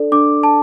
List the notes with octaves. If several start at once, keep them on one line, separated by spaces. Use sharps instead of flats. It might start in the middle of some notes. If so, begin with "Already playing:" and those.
Already playing: D4 A4 D5
D4 D6
A5